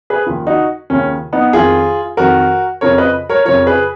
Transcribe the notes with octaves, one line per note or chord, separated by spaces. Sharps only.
G#4 B4
D#2 C#3 F3
D#4 F#4
D#2 C#3 F3 C#4
B3 D#4
F2 D#3 F4 G#4
F2 D#3 F#4 A#4
F2 C#3 F3 A#4 C#5
B4 D#5
A#4 C#5
F2 C#3 F3 A#4 C#5
G#4 B4